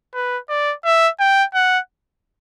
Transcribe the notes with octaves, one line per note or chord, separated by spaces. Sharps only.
B4
D5
E5
G5
F#5